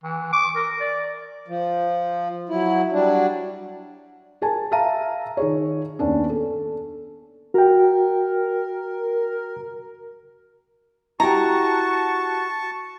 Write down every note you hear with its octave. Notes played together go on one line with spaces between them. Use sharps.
E3
D6
A#4
D5
F3
F#3 E4
F#3 G3 D4
G#4 A#4 G#5 A5
E5 F5 A5 A#5 D#7
D#3 G#4 C#5
D#2 B3 C#4 D4
A4
F#4 A#4 G5
E4 F#4 G4 A5 A#5 C#6